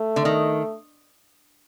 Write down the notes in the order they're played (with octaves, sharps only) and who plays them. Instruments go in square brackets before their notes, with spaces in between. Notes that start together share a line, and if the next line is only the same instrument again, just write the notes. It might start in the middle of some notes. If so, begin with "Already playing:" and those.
Already playing: [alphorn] A3
[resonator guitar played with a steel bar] D3
D#3